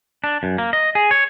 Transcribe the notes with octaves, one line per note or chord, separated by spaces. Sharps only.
D4
F#2
A#3
D#5
G#4
C#5